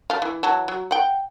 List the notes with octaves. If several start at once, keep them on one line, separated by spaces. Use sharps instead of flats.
A3 F5
E3
E3 F#3 A5
F#3
F#5 G5